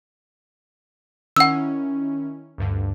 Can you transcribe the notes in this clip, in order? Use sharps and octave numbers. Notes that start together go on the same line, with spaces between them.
D#3 C#4 E4 F#5 E6
D2 G2 D3